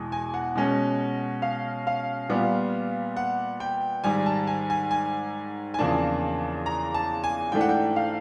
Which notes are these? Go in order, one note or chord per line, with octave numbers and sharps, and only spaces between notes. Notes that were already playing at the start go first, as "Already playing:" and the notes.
Already playing: E2 B2 G#3
G#5
F#5
B2 G#3 C#4
F5
F5
A#2 G3 B3
F#5
G5
G#2 D#3 G3 G#5
A5
G#5
G#5
G#5
G#5
E2 C#3 F3 A#3 D4 A5
A#5
A5
G#5
G#2 E3 A3 D4 G5
F#5
G5
F5